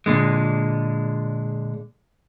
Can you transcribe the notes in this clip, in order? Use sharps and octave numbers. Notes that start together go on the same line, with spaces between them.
A#2 D3 G#3